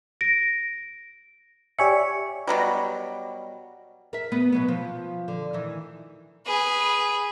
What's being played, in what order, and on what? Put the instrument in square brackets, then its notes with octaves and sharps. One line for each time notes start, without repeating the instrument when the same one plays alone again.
[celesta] A#6 D7
[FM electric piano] G4 C#5 E5 [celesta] D5 G#5 C#7
[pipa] B2 E3 F#3 G3
[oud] A#4 E5
B3
B2 F#3 B3
F3
D3
D#3 E3
[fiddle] G#4 B4